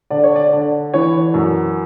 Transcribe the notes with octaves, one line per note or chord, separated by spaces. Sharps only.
D3 D5
C#5
D5
D3
E3 C#5
F#2